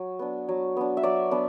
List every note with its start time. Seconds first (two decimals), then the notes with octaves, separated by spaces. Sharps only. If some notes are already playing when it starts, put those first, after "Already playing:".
Already playing: F#3
0.19 B3 D4
0.49 F#3
0.77 B3 D4
0.97 E5
1.03 F#3 D5
1.31 B3 D4